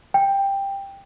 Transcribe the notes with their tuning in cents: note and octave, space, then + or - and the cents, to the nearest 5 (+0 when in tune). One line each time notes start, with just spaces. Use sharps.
G5 +10